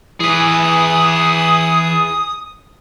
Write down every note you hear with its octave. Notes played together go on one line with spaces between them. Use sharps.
E3 G#4 B4 D#6